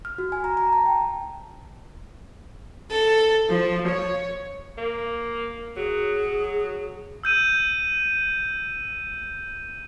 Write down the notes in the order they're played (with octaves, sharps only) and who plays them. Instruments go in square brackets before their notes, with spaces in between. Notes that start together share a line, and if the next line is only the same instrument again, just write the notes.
[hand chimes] F6
F#4
G#5
A#5
A#5
A5
G5
[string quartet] A4
F3
C#5
[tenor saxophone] A#3
[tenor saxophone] F#3 [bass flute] G#4
[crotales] E6 G6 D#7